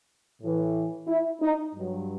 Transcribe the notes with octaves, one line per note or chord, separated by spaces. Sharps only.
A2 E3
E4
D#4
G2 F#3